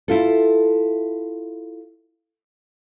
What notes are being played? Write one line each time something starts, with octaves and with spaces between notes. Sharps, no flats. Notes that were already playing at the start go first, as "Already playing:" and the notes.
E4 F4 A4